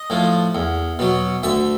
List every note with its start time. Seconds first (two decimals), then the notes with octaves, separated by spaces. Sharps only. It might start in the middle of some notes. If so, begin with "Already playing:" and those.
Already playing: D#5
0.10 A2 F3
0.55 E2
0.99 B2 F#3
1.43 D2 E5